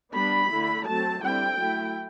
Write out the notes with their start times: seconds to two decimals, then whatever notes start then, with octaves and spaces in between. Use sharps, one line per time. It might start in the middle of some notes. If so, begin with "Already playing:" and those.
0.14 G3 B3 D4 B5
0.51 D3 A3 E4
0.86 F#3 A3 C4 A5
1.22 D3 G3 C4 E4 G5
1.57 F#3 A3 E4